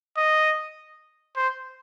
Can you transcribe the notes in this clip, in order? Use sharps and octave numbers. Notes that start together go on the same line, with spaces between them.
D#5
C5